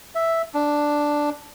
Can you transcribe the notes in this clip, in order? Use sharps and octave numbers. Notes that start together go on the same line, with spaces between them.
E5
D4